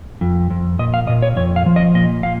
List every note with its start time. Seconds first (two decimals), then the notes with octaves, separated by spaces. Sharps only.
0.21 F2
0.50 F2
0.79 A#2 D#5
0.94 F5
1.07 A#2 D#5
1.22 C#5
1.36 F2 C#5
1.56 F5
1.66 F3
1.76 D#5
1.94 A#2 D#5
2.23 A#2 F5